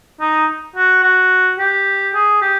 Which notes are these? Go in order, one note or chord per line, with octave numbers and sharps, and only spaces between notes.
D#4
F#4
F#4
G4
G#4
G4